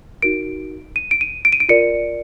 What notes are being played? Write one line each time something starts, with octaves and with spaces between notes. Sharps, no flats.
D#4 F#4 A#4 D7
D#7
D7
D#7
D7
D#7
D7
F4 A#4 D5 C#7